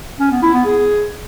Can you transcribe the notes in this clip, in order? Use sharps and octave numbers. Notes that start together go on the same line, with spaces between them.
C#4
B3
E4
B3
G#4